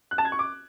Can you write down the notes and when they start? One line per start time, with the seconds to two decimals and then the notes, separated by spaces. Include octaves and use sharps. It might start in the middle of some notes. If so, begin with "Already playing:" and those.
0.11 F#6
0.18 A5
0.25 G#6
0.32 C#6
0.39 D6